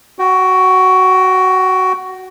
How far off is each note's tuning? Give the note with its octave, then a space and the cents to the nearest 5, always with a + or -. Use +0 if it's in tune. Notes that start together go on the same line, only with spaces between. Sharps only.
F#4 +10 G5 -20